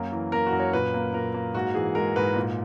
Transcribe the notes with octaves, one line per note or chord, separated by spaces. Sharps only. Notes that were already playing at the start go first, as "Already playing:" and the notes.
Already playing: F#2 A#3
E3
A#3 A#4
F#4
F#2
C#5
A#2 B4
A#3
A#2 A#4
A#3
G#2 F#4
E3 G#4
G#3 A#4
G#2 B4
A#2